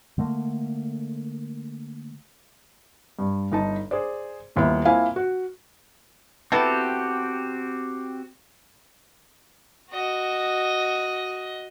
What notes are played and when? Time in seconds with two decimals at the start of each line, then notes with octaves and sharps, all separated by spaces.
0.18 D3 A3 A#3
3.19 G2
3.52 G1 D#4 A5
3.91 G#4 C5 D5
4.56 D#1 D#2 B3 E4 E5
4.85 A#3 C4 E4 F4 F5 G#5
5.16 F#4
6.52 B3 C4 E4 F#4 G4 A4
9.90 F#4 D#5